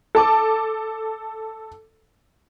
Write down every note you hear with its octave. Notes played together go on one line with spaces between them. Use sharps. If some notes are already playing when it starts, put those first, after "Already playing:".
A4 A5 D6